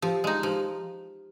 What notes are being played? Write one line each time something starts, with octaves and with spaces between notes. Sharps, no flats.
F3 G4
G#3 D#4
F3 G4